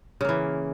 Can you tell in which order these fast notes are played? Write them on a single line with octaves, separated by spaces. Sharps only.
C#3 A#3 E3